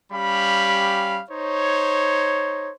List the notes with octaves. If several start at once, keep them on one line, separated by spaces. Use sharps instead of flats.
G3 C#4 G4 F5 B5
D#4 C5 C#5